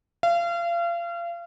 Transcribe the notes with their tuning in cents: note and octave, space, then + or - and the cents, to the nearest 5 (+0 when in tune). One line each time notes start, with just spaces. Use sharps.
F5 -35